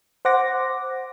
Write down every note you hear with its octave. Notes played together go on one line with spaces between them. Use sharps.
C5 F#5 D6 A#6